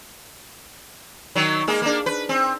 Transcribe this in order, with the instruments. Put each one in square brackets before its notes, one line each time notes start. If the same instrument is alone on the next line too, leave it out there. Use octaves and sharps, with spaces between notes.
[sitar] D#3 F#3
G#3 A#3
A#3 D4
B4
C4